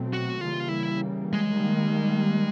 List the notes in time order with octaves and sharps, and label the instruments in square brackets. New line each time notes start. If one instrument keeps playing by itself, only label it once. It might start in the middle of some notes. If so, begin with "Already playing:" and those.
Already playing: [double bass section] B2 F#3 A3 C4
[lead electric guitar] F#4
[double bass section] C#3 E3 G3 A#3 [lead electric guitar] F4
[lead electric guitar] E4
G#3
[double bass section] D#3 G3 A#3